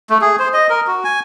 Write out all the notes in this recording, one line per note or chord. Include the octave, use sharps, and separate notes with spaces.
A3
G#4
C5
D#5
A#4
F#4
G#5